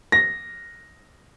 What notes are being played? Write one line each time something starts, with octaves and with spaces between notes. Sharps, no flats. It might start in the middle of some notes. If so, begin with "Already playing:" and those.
A#6